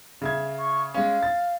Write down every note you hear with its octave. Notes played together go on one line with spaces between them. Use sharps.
C#3 E5 G#6
C#6
G#3 C#4 F5
A6